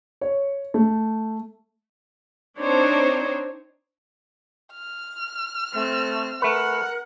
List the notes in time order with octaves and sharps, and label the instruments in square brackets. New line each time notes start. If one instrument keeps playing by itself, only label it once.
[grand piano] C#5
A3
[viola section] C4 D4 D#4 C5 C#5
[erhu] F6
[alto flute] A3 [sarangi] C4
[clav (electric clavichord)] A3 B4 [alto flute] A#4 [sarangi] F#5